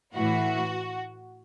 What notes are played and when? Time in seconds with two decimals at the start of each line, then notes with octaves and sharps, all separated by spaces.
0.13 A2 E3 F#4